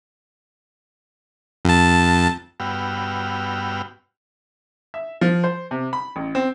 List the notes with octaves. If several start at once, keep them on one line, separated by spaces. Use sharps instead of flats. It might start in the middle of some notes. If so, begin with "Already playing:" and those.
F2 A5
G2 B3 F#4 G5 E6 F6
E5
F3
C5
C3
B5
A1
C4